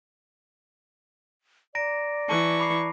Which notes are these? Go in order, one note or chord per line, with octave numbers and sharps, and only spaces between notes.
D5 A#5 A#6 D7
E3 A5 C#6
B5 D6 C7